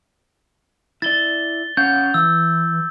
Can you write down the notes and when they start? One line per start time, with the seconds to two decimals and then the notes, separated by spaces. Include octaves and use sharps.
1.02 E4 D5 A6 G7
1.77 C#4 F5 F#5 G6
2.14 E3 E6